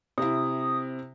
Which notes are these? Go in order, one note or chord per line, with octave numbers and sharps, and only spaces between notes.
C3 E4 D#6